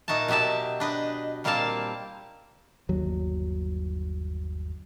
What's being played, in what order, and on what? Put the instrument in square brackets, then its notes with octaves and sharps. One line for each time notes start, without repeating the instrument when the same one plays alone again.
[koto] A#2 D#4 F#4 E5 A5
B2 F#3 G4 E5 A5
D4 B4 D#5
A#2 G3 A#3 C4 F5 A5
[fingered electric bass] G1 D#2 F#3